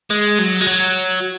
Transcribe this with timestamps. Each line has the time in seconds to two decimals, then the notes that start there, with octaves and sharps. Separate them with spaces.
0.10 G#3
0.39 F#3
0.61 G#3
0.67 F#3